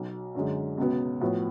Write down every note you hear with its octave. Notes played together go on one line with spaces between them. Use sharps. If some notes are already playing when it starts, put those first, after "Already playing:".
Already playing: B1 B2 F#3
F#2 D3 G#3
C#2 B2 F#3 B3
A2 F3 B3 F#4